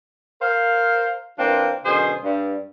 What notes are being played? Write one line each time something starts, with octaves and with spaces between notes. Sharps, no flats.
A#4 C5 F5
E3 A#3 C4 D4 F4
F#2 B2 D3 G#4 C5
G2